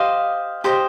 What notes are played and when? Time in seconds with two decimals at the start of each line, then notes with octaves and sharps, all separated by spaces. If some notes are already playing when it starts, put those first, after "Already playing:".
Already playing: G4 C5 D#5 F5
0.64 G4 C5 D#5